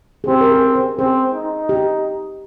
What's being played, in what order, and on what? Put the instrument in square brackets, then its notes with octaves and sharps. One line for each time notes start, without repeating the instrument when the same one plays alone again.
[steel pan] G#4
[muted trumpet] C4 [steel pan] G4
[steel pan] A#4
G#4
G#4
[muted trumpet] C4 [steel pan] G#4
[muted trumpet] D#4
[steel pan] G4